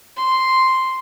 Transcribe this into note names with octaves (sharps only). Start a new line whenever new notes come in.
C6